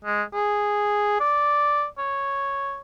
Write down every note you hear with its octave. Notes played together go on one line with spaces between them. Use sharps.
G#3
G#4
D5
C#5